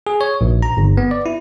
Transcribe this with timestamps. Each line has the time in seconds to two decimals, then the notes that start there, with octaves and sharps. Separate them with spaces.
0.07 G#4
0.21 C#5
0.41 A#1
0.62 A#5
0.77 G1
0.97 B3
1.11 D5
1.26 E4